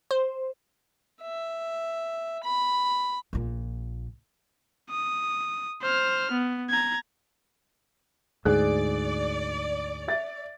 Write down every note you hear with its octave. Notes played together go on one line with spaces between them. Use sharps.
C5
E5
B5
A#1 A#2
D#6
C5 F6
B3
A#5 G#6
D2 G#2 G#4 D5 F#6
E5 A6